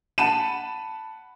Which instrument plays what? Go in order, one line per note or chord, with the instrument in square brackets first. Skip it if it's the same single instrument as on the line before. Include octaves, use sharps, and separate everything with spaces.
[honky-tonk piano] F#5 A5 B5 D#7 E7